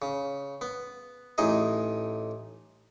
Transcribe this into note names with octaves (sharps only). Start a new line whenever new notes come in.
C#3
B3
A1 A2 D#4 G#4 D#5